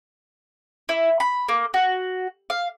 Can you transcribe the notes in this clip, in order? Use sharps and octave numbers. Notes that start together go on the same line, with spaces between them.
E4
B5
A#3
F#4
F5